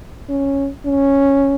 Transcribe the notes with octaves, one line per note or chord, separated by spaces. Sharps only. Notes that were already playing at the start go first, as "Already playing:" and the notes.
C#4
C#4